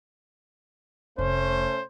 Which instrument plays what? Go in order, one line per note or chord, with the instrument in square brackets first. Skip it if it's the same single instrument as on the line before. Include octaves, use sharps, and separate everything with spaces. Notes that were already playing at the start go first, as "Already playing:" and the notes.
[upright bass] F1 [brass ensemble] A3 C#4 C5